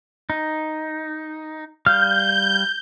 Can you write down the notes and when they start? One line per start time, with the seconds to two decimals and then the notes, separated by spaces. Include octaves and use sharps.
0.30 D#4
1.86 G3 F5 F6 G6